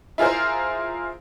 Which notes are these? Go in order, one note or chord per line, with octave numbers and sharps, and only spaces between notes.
E4 F4 G#4 A#4 C5